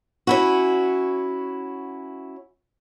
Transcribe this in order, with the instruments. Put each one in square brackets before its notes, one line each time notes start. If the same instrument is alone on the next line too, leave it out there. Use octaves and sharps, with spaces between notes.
[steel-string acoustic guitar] C#4 E4 F#4